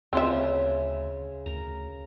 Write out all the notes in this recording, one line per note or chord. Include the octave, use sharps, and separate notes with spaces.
D2 C#3 C4 F4 A#4 B4 E5
D2 A#4 A#5